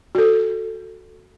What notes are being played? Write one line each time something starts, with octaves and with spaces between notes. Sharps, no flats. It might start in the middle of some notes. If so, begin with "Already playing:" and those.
F#4 A4